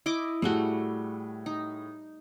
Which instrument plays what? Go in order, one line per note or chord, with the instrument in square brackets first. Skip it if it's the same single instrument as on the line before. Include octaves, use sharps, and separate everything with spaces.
[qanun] E4 D#5 D6
[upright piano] A2 G#4 G7 [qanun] G3 A3 F#4
[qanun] D#4